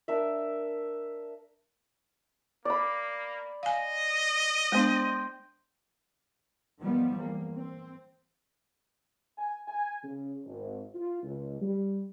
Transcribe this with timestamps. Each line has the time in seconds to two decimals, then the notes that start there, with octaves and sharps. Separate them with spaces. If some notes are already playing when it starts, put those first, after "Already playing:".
0.08 D4 A#4 E5
2.65 A#3 D5 B5
3.63 D#5 F5 G#5
4.72 G#3 B3 D4 C5 G5
6.81 D#3 F3 G3 B3
7.15 E2 A#3
7.54 C4
9.37 G#5
9.68 G#5
10.03 C#3
10.45 G#1
10.94 F4
11.23 C#2
11.60 G3